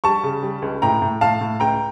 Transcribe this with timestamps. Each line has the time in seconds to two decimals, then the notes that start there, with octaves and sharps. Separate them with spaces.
0.04 G3 A5 C#6
0.23 C#3
0.43 G3
0.62 C#2
0.82 A2 G5 A#5
1.02 A2
1.21 A2 F5 A5
1.41 A2
1.60 C#2 G5 A#5